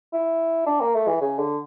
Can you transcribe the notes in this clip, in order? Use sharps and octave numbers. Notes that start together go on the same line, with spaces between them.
E4
D4
A#3
A3
E3
C#3
D3